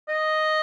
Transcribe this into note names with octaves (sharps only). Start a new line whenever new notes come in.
D#5